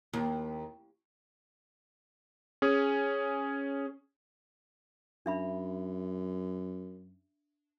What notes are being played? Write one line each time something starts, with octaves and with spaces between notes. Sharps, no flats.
D#2
C#4 G#4
F#2 D4 E5 B5